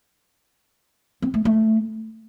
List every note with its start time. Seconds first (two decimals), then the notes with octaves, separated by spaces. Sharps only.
1.22 C4
1.34 A3
1.45 A3